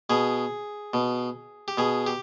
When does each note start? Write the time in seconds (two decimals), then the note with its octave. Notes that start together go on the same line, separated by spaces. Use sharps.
0.10 B2 G#4
0.94 B2
1.68 G4
1.78 B2 G#4
2.07 G4